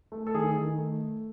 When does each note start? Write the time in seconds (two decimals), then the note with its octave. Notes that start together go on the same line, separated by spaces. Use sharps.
0.12 A3
0.27 A4
0.34 D#3 G#4
0.57 D#3
0.78 A3